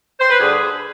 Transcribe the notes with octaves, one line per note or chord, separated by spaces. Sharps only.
C5
B4
D2 D3 G3 D4 G#4